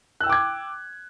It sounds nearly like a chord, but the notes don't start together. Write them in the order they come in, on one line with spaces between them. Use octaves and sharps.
F#6 E6 G5 D6 G#6